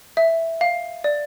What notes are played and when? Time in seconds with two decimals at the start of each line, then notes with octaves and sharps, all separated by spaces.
0.17 E5
0.61 F5
1.04 D5